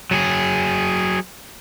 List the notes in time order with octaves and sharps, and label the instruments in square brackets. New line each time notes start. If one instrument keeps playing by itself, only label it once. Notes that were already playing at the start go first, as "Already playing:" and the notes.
[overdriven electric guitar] F#3 G#4